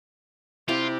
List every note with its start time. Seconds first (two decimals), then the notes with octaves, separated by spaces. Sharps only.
0.68 C3 E4 F4 G4 D5